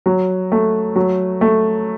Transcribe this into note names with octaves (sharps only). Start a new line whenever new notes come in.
F#3
A3
F#3
A3